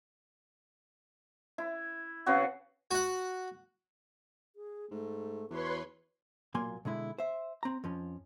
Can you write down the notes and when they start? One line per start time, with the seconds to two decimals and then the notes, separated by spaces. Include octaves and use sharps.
1.58 E4
2.26 C#3 B3 C4 F#4
2.91 F#4 F#5
4.56 G#4
4.91 G#2 A3
5.50 E2 F#4 B4 C#5 C6
6.54 B1 A#2 F#3 A#3 G#5 C6
6.85 B2 D3 G#3 E4
7.18 C5 E5
7.63 C4 A#5
7.84 F2 F3 C#4